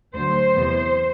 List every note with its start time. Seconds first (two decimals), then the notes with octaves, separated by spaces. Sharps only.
0.16 D2 D3 F#3 A3 C5
0.54 E2 C3 E3 B3